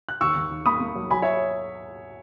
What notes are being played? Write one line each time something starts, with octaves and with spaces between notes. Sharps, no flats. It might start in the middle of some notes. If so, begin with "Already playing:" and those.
F#6
D#2 C#6 E6
D#2
D#3
A#3 B5 D#6
A#3
F#3
F#3 G#5 B5
C#5 E5